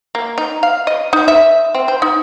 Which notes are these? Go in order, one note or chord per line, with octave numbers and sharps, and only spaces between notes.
A#3
D#4
F5
D#5
D#4
E5
C4
C5
D#4